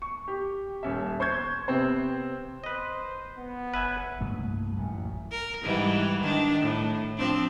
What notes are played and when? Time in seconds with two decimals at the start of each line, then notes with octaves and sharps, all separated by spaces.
0.02 C#6
0.28 G4
0.83 D#1 C#4 E5
1.20 C5 C#6 G6 G#6
1.68 C3 B3 C4 C5
2.64 B4 C5 D#5
3.38 B3
3.74 F#1 B4 E5 G#5
4.21 C2 G2 A3 A#3
4.76 A1 F#2 A#2
5.31 A#4
5.62 G#2 E3 G3
6.21 D#3 D4
6.60 A2
7.17 F3 C4 D4